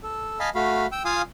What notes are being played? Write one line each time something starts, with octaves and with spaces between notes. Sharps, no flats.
A4
D#5 F5 G#5 A5 B5
A3 F#4 F5 B5
G5 E6
F4 F5 G#5 D#6